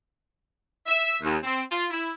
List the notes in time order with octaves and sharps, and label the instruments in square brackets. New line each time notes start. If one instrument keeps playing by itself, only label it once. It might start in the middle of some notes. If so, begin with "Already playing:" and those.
[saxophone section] E5
D#2
C4
F4
E4